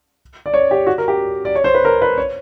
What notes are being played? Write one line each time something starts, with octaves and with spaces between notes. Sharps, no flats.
D5
C#5
G4
F#4
A#4
G4
D5
C#5
C5
B4
A#4
B4
C#5